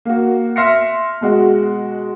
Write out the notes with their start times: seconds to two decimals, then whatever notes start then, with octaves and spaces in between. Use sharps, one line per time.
0.05 A#3 F#4
0.56 E5 C6 F6 A#6 C7 C#7
1.21 B2 G#3 F#4